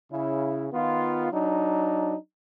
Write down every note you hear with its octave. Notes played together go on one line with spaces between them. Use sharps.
C#3 E4
D#3 B3 F4
F#3 D4 D#4